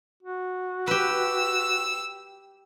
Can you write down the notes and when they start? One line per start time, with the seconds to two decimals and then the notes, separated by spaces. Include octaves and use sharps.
0.23 F#4
0.87 G4 B4 E6